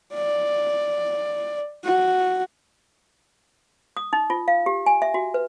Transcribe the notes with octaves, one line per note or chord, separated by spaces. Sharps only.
D5
F#4
D#6
D#4
F4
F5
G4
G#5
E5
F#4
B4